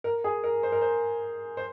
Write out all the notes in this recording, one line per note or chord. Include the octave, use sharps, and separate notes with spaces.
A#4
G#4
A#4
C5
A#4
C5
C5